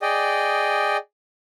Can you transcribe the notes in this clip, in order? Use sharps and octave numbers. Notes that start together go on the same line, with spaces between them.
G#4 D5 D#5 G5